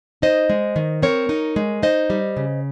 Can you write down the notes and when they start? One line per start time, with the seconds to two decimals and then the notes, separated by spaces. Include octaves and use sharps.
0.22 D#4 C5 D#5
0.50 G#3
0.76 D#3
1.02 C4 A#4 C#5
1.29 D#4
1.56 G#3
1.83 D#4 C5 D#5
2.10 G3
2.37 C#3